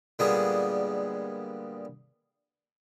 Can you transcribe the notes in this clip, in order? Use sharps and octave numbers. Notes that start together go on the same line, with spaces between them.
A#2 D3 G3 G#3 B3 G#4